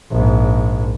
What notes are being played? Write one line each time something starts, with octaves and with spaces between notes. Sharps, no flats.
A#1 G#2